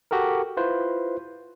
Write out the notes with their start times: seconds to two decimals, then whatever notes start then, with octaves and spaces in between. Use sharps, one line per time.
0.11 F#4 G4 A4 A#4
0.57 E4 F4 B4 C5